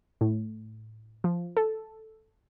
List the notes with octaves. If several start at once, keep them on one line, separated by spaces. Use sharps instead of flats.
A2
F3
A4